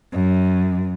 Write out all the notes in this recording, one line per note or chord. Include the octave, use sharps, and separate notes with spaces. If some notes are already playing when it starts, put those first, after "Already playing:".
F#2